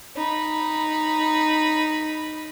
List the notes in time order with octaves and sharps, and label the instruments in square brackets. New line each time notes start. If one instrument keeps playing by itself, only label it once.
[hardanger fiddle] D#4 B5